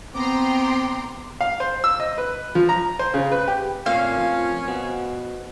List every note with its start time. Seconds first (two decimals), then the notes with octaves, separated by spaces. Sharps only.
0.14 B3 C4 G5 A#5 C6 D6
1.41 F5
1.60 C5
1.84 E6
2.00 D#5
2.18 B4
2.55 F3
2.69 A#5
2.99 C5
3.14 C#3
3.32 B4
3.48 G4
3.86 A#2 A3 C4 C#4 A#4 F5
4.17 F3
4.68 B2 B4 C5 F#5